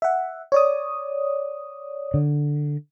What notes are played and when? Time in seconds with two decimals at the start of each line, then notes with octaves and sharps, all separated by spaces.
0.02 E5 F#5
0.52 C#5 D5 D#6
2.14 D3